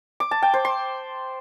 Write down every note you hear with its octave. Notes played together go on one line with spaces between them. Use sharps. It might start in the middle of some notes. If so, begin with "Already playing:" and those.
D6
A5
G5
C5
C6